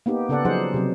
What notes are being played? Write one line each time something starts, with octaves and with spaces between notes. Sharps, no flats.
A#3 B3 D#4 G4
C#3 B3 A4 D5 F#5
F3 F#3 D#4 G#4 C5 F#5
C3 F#3